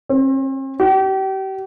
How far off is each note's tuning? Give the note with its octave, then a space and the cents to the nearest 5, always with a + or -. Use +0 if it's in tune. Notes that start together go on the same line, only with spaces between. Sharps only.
C4 +45
G4 -35